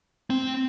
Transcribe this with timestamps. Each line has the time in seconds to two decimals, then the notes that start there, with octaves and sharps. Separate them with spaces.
0.30 C4